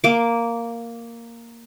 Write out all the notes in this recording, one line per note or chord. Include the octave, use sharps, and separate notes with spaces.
A#3 D6